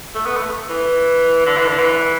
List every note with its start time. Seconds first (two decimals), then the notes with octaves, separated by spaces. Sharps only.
0.15 A3
0.26 B3
0.37 A3
0.70 E3
1.46 D3
1.57 E3
1.68 D3
1.79 E3